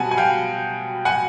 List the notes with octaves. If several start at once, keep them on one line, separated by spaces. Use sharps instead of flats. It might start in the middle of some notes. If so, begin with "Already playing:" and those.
Already playing: B2 G3 F#5 G#5 A5
G#5
F5 G5
F#5 G#5